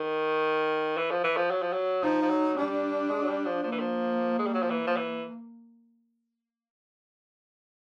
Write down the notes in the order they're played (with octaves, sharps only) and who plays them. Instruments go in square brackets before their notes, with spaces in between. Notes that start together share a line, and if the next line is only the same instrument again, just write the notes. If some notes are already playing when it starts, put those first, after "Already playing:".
Already playing: [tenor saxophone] D#3
E3
F3
E3
F3
F#3
F3
F#3
[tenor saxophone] F3 [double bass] D#4
[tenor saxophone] F3
F#3
[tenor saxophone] G3 [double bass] D4
[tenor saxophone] G#3
F#3
G3
F3
[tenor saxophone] F3 [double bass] A#3
[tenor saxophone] E3
F3
G#3
G3
F#3
F3
E3
F3
E3